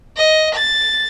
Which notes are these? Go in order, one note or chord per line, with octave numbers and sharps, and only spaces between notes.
D#5
A6